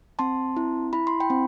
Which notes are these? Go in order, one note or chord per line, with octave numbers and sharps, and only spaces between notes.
C4 A5 C6
E4
E4 B5
C6
G5 B5
C4